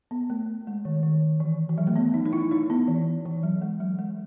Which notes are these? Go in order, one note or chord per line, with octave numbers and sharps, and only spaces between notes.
B3
A3
G#3
D#3
D#3
E3
E3
F#3
A3
B3
D#4
D#4
E4
D#4
B3
E3
E3
F#3
G#3
F#3
G#3